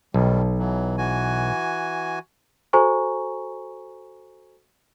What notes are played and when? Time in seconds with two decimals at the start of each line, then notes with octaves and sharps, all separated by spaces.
0.14 B1 D#3 G3
0.59 E3 F#3
0.98 E3 F#4 G#5
2.73 F#4 A4 C5 G#5 A#5 C#6